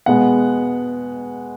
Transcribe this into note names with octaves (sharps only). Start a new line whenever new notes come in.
B2 G#3 B3 F#5